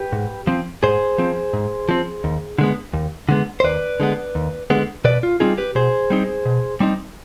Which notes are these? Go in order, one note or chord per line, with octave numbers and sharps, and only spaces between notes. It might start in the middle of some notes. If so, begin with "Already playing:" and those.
Already playing: G4 B4
G#2
F3 C4
G#2 G#4 C5
F3 C4
G#2
F3 C4
D#2
D3 G#3 B3
D#2
D3 G#3 B3
C5
D#2 B4 D5
D3 G#3 B3
D#2
D3 G#3 B3
B2 B4 D5
F4
G3 C4 D#4 F4 G#4
G4 B4
B2 G#4 C5
G3 C4 D#4
B2
G3 C4 D#4